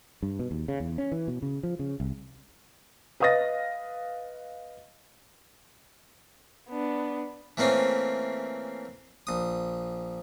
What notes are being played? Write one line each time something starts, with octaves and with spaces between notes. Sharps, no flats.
G2
B2
D#2
C#3
E2
C#4
E3
B2
C#3
F3
C#3
C2
B4 D#5 F5 D#6 A6 A#6
B3 D4
E3 A3 A#3 C4 C#4
A#1 D#6